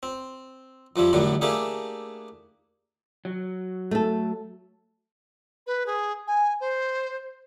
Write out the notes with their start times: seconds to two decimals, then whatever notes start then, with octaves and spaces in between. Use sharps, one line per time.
0.03 C4
0.96 F2 F3 G3 E4
1.13 A1 F#2 D3 F#3 G3
1.41 A3 A#3 D4 E4 G4 G#4
3.25 F#3
3.91 A3 A4
5.66 B4
5.86 G#4
6.27 G#5
6.60 C5